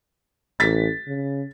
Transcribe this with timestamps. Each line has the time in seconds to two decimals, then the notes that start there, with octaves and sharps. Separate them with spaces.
0.60 A1 A6 B6
1.07 C#3